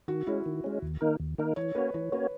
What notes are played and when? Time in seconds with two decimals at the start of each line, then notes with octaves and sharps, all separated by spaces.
0.08 D#3 F#4
0.27 G#3 C#4 E4
0.46 D#3
0.64 G#3 C#4
0.82 D#2
1.01 D#3 A#3 D#4 A#4
1.20 D#2
1.38 D#3 A#3 D#4 A#4
1.56 E3 C#5
1.75 A#3 C#4 F#4 B4 C#5
1.94 E3 C#5
2.12 A#3 C#4 F#4 B4 C#5